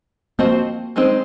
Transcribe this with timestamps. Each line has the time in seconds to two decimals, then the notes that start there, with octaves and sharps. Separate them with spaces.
0.39 F3 A#3 C4 F#4 C5 D#5
0.96 D#3 G#3 C4 D#4